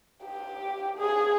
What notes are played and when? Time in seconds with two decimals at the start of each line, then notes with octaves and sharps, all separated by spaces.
0.24 G4
0.98 G#4